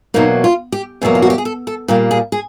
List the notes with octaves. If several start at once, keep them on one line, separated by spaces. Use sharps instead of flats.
E2 B2 F#3 A#3 D#4
F4
G4
E2 B2 F#3 A#3 G#4
F4
F#4
G4
G#4
A4
A4
A#2 G3 A#3 G4
G#4
G#4